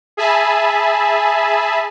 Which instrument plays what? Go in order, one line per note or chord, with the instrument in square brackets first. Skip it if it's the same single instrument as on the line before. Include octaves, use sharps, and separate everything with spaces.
[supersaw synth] G#4 E5 G#5 A5 B5